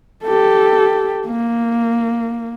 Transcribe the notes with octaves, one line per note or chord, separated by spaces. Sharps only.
G4 A4
A#3